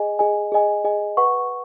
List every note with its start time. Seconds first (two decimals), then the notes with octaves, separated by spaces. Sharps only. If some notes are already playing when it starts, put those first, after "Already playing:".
Already playing: G#4 D#5 G#5
0.19 G#4 D#5 G#5
0.52 G#4 D#5 G#5
0.84 G#4 D#5 G#5
1.17 B4 F#5 C#6